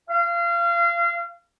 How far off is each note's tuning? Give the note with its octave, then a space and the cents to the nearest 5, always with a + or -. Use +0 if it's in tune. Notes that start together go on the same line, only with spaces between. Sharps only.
F5 -30